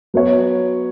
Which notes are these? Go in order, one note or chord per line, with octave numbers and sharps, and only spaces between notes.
F#3 B3 F#4 C#5